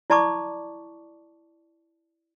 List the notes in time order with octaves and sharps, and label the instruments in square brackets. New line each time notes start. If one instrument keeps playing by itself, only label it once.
[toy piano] E4 D5 A5 B5 C#6 D6